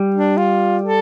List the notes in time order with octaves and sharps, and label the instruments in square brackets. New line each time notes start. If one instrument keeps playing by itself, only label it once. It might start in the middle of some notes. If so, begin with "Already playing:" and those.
Already playing: [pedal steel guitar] G3
[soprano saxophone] D4
F4
A4